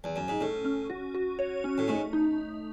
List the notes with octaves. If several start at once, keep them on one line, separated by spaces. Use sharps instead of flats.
E2
F#2
G#2
A2 C#4
C#4
F#4
F#4
C#5
C#4
A2
G#2 A3
D#4